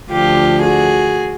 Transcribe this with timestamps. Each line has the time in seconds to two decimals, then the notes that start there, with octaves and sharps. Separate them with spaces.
0.10 D2 D3 F3 F4 G4
0.62 F#4 G#4